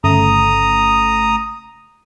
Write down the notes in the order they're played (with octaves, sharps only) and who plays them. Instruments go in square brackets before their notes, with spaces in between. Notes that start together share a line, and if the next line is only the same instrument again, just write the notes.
[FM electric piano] G1 C#3 A3 [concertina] A#5 D#6